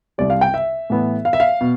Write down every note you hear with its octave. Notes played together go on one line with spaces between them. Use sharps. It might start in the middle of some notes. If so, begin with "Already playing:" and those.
C2 C3 G3 D5
F5
G5
E5
A2 E3 B3
F5
E5
F5
B2